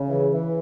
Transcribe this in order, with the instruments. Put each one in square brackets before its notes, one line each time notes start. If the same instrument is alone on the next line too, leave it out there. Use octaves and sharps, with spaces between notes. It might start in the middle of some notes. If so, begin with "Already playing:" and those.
Already playing: [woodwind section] C#3
E3
E3